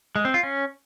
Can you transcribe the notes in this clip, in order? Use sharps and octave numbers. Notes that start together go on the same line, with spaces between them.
G#3
C4
F4
C#4